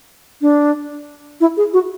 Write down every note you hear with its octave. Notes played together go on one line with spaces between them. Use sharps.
D4
E4
G#4
F#4